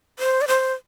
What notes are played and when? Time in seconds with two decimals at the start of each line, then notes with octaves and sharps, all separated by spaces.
0.19 C5
0.41 D5
0.48 C5